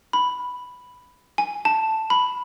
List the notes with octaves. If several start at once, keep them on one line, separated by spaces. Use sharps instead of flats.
B5
G#5
A5
B5